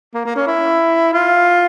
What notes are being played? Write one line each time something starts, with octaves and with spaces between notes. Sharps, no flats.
A#3
A#3
C#4
E4
F4